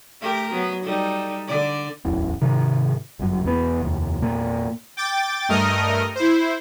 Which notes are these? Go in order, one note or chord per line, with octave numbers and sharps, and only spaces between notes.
A3 G4 A#4
F#3 B3
G3 D#4 A4
D3 D5
D1 A1 E2
G#2 C3 D#3
G1 F#2
E1 E2 G#2 B3
F1 D#2
G#1 E2 A#2 A#3
G5 D6 A6
G2 A3 A#4 D#5 D#6 F6
E4 C5